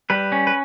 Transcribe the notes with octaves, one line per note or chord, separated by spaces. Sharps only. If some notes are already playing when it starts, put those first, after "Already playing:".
G3 B4
C#4
B4